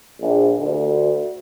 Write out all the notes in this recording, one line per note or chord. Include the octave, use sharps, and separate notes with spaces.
A#1
D2